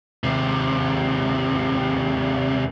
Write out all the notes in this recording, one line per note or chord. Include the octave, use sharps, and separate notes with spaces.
D#2 C3